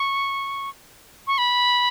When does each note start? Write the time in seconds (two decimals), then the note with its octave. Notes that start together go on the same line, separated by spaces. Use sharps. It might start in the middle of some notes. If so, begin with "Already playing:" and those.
Already playing: C#6
1.27 C#6
1.38 B5